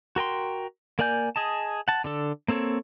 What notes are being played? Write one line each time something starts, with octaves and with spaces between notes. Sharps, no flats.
F#4 A#4 G5 C6
A#3 A#4 D5 G#5 G6
G#4 D#5 A5
F#5 A5
D3 D4 A4
A#3 C4 A4 C#5